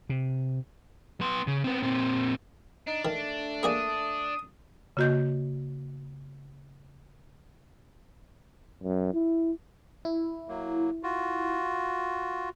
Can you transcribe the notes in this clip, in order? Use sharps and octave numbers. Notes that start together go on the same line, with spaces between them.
C3
B3 C6
C#3
B3 C4
A#2 C4
D4 D#4
D#3 A3
A#3 G#4 D5 D#6
C#3 A#3 F#4 D#5 G6
F#2
E4
E4
F#3 A#3
F4 F#4